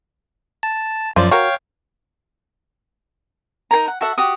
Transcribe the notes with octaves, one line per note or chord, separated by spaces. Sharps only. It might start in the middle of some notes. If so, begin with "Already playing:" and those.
A5
F#2 F3 F4 C5 D5
F#4 A#4 C#5 F5 G5
D#4 G#4 A#4 A#5
F#5
F#4 A4 E5 F#5
F#4 G4 D#6